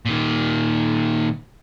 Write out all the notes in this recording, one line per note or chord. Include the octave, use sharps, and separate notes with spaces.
A#2 D#3